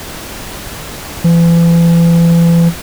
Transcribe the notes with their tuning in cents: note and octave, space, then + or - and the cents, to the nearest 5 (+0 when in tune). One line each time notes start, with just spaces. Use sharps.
E3 +40